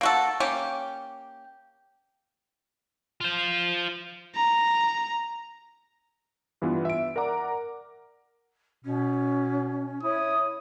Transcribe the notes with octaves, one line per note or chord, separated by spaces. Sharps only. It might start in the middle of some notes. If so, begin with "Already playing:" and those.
A#3 F#4 A4
A#3 C#4 G4
F4 C5
A#5
G2 E3 B3 F4
E5 D7
A#4 D5 F#5 A#5 D6
B2 C#4
E4 C#5 D#6